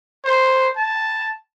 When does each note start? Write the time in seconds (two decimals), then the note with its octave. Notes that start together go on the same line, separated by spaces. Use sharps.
0.25 C5
0.77 A5